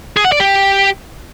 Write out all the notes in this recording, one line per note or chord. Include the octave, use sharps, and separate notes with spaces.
G#4
F#5
D5
G4